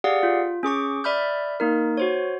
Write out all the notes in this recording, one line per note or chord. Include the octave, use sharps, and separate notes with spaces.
G4 G#4 D5 F5 F#5
F4
C#4 G#4 C#6 D6
D5 E5 B5 F6 G6
A#3 D#4 A#4
F#4 C5 C#5